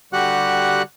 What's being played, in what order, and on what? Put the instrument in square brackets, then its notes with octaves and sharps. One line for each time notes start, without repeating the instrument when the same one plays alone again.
[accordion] D3 G3 F#4 G4 F#5 F#6